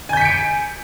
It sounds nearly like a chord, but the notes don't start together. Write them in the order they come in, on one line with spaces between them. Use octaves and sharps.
G#5 G6 B6 C#7 D7